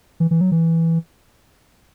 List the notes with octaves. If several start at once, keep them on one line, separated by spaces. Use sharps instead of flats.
E3
E3
F#3
E3